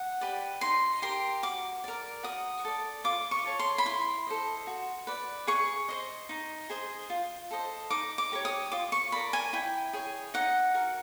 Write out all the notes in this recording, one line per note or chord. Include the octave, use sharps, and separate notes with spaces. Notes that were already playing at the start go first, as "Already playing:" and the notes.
Already playing: F#5
G4 B4 D5
D#4 C6
G4 A#4 C6
F#4 D6
A#4 D5
F#4 D#6
A4 D5
F4 D6
C#6
A4 C#5
C6
B5
E4 C6
A4 C5 D#5
F#4
B4 D5
G#4 C#6
C5 D#5
D#4
G#4 C5 D#5
F4
A4 C5 D#5
D#4 D6
D6
G4 A#4 C#5
D#6
F4 D6
C#6
A#4 D5 B5
G#5
E4 G5
G#4 C#5
D#4 F#5
F#4 A#4